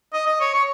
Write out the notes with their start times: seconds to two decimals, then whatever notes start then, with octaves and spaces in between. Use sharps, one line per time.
0.13 D#5
0.26 D#5
0.41 C#5
0.54 C#5